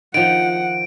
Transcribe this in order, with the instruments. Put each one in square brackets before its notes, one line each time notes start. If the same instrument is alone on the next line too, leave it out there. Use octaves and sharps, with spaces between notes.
[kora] D#3 F3 [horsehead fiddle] F#5 [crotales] D7